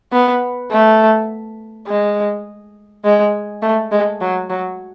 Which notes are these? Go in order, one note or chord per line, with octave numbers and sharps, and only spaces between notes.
B3
A3
G#3
G#3
A3
G#3
F#3
F#3